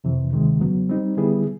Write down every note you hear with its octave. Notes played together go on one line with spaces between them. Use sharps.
F2 C3 E3
D2 C3 D#3 G#3
E2 C#3 F#3 B3
G3 C4 D#4
D3 G3 B3 E4 G#4